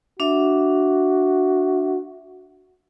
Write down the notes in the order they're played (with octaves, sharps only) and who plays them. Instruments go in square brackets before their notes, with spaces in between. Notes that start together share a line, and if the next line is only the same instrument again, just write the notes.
[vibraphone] D4 E5 [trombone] F#4